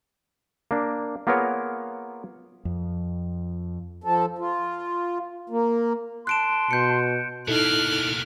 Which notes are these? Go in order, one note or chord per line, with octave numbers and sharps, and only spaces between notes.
A#3 D4
A#3 B3 F4 G#4 A#4 C#5
F2
F3 A4
F4
A#3
A5 C6 F#6 D7 E7
B2 G6 C#7
B2 A#3 D#4 E4 A4 F6 F#6